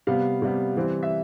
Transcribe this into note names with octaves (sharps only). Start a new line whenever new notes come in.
C3 G3 B3 F5
C3 G3 B3
E3 G3 C4
E5